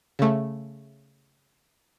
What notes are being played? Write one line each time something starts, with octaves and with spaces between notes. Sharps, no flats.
C#3 A3